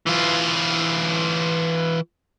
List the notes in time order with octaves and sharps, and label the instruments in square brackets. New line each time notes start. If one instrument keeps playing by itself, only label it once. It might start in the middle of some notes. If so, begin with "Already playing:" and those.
[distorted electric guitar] E3 F4